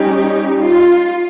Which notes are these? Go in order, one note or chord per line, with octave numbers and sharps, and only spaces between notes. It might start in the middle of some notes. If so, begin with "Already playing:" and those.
Already playing: G3 C#4 D#4 G4
F4